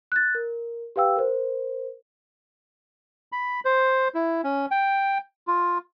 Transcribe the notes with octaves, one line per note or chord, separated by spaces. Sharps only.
F#6 A6
A#4
G4 B4 F5 G5 E6
A#4 C5
B5
C5
E4
C#4
G5
F4